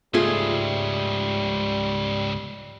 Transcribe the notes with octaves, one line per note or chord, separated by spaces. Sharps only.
C#2 G#2 G3 A3 F4 G#4